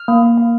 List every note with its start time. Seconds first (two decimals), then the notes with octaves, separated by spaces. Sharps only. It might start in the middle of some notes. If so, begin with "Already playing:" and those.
Already playing: F6
0.08 A#3
0.23 A#3
0.37 A#3